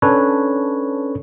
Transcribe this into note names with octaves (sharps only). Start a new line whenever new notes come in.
C#4 D4 A4 B4 C#5